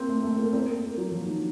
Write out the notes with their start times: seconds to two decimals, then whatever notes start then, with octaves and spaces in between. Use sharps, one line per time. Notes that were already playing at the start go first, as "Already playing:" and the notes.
Already playing: A#3 C4
0.08 A3
0.23 A3
0.38 A#3
0.53 C4
0.63 A#3
0.75 A#3
0.86 A#3
0.98 F#3
1.12 F3
1.26 D#3